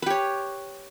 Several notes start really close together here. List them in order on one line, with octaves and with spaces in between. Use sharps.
B4 G4 C#5